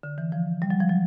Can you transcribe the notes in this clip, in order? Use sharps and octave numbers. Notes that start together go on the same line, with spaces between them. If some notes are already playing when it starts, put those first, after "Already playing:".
D3
E3
F3
G3
F#3
F3
F#3